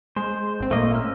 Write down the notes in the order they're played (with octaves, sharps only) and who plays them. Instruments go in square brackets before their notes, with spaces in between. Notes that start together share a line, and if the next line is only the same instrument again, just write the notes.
[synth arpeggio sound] G#3 [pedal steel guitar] C5
[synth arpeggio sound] G#1 C4
[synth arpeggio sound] A#2 A#3 [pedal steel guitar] A3 D#5
[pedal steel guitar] C#4 E6 F6